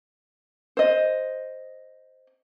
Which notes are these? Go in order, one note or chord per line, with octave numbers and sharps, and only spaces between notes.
C5 D#5